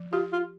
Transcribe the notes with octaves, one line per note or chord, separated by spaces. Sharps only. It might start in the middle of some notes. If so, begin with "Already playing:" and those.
Already playing: F3
F4 G4
F4